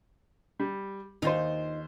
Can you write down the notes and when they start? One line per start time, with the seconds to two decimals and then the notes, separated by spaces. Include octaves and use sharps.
0.60 G3
1.22 D#2 D#4 F4 C5